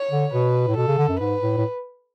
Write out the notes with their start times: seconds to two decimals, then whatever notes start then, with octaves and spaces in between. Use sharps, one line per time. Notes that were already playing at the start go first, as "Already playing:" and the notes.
Already playing: C#5
0.11 D3
0.32 B2 B4
0.67 A2
0.77 B2 A4
0.88 C#3
0.98 D3
1.09 F#2
1.20 G#2 B4
1.42 A2
1.58 A2